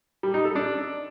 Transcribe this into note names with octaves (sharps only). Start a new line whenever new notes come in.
G3
D#4
A4
D4